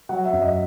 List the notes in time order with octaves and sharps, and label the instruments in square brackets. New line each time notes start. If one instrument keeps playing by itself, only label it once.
[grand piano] F#3 F#5
E5
F#2
D#5